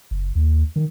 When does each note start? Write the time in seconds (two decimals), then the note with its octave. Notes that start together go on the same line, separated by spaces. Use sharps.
0.11 F#1
0.35 D#2
0.76 D#3